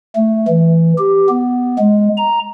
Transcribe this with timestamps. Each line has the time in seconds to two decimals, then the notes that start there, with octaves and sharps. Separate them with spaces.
0.16 A3
0.48 E3
0.98 G4
1.30 B3
1.79 G#3
2.17 A#5